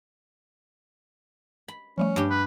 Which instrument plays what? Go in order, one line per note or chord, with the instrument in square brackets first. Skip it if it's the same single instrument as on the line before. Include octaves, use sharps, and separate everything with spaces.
[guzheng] B5
[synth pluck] F3 G3 A3 [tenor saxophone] C#4
[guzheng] G2 G4
[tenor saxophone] B4